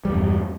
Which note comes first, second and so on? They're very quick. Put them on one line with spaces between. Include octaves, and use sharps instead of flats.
G3 E2 G2